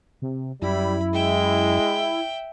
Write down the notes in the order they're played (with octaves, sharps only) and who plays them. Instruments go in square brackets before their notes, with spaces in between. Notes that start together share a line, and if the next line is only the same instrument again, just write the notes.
[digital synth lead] C3
[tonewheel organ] F#2 [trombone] G3 [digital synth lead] E4 [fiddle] B5
[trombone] G#3 [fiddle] E5 G5